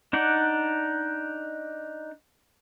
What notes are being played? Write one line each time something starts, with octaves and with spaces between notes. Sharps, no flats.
D4 D#4 D5 F#5